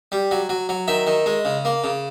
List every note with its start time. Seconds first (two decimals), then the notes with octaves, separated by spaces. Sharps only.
0.12 G3
0.31 F#3
0.49 F#3
0.69 F#3
0.88 D#3 E5
1.07 D#3
1.26 G#3
1.45 C#3
1.65 A#3
1.84 C#3